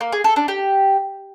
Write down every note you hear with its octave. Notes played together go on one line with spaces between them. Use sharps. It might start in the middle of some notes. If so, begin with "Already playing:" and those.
A#3
G#4
A4
D4
G4